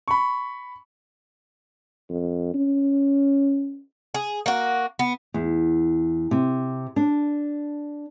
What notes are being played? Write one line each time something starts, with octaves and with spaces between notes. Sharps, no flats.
B5 C#6
F2
C#4
G#4
A#3 F#4
B3
E2
C3
D4